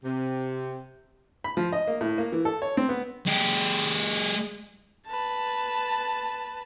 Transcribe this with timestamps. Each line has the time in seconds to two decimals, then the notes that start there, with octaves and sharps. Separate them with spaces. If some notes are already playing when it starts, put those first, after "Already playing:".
0.04 C3
1.44 B5
1.57 F3
1.73 D#5
1.87 A#3
2.01 A2
2.18 A#3
2.32 E3
2.45 A4
2.62 C#5
2.77 C4
2.89 B3
3.26 G#3 G4
5.07 B4 A5